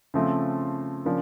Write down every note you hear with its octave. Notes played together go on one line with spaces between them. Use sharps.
C#3 F3 A3 C4
C#3 F3 A#3 D4